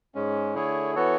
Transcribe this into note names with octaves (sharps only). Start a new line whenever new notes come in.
G#2 G#3 C#4
D3 A3 E4 G#4 C#5
E3 B3 F#4 A4 C#5